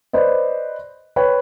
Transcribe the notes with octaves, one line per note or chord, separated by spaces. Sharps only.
B4 C5 D5 D#5
B4 C#5 G5